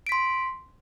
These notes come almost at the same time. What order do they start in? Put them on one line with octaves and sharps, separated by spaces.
D7 B6 C6